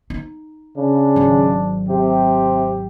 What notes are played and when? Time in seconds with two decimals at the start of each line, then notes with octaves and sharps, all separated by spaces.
0.10 D#4
0.77 C#3 D4
1.16 G#1 F#3
1.88 C3 G4